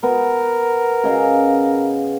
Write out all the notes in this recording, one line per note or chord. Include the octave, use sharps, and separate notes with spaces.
B3 A#4
C#3 D#5 F5